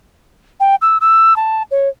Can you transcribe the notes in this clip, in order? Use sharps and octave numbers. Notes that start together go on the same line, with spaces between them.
G5
E6
E6
A5
C#5